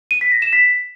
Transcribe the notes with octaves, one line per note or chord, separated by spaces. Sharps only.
D#7
B6
A#6
E7
B6